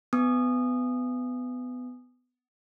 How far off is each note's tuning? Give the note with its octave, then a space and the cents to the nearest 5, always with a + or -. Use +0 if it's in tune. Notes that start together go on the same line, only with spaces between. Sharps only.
B3 +20 G#5 +0 D#6 -20